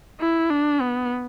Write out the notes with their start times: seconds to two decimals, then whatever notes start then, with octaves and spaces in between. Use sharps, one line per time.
0.20 E4
0.51 D4
0.81 B3